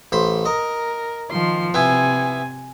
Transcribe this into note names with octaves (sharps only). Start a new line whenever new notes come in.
A1 C5 B5
A#4 D#5
D#3 F3 C6
C3 B3 E4 G#5